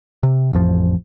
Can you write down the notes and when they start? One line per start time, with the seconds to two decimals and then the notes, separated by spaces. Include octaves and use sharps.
0.23 C3
0.53 A1 F2 F3